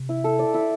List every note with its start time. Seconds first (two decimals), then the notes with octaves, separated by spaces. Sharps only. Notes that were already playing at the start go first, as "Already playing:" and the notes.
Already playing: C3
0.09 E4
0.24 A4
0.39 D5
0.54 E4